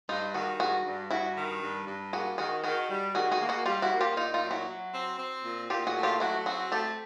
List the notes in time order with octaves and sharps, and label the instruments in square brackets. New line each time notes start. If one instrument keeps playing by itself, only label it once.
[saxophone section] G2 [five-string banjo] D#4 F4
[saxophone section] D#3 [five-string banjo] F#4 G#4
[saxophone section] G2 [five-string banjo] F#4 G#4
[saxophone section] G2
[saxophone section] G2 [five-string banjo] E4 F#4
[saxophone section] D#3
G2
G2
[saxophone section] A#3 [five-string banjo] F#4 G#4
[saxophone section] D#3 [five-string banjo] F#4 G#4
[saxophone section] D#3 [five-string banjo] F#4 G#4
[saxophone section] G3
[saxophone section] D#3 [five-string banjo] F#4 G#4
[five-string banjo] F#4 G#4
[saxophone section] A#3
[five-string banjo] F#4 G#4
[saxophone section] G3 [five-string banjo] F4 G4
[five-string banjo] E4 F#4
[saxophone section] A#3
[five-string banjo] F4 G4
[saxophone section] A#2 [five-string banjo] D#4 F4
[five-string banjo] D#4 F4
[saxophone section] F#3
[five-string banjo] E4 F#4
[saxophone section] F#3
C4
C4
A#2
[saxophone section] A#2 [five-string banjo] F4 G4
[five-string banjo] F#4 G#4
[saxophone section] A3
[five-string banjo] F4 G4
[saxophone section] F#3 [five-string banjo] E4 F#4
[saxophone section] C4 [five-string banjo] F#4 G#4
[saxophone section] A3 [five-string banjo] G4 A4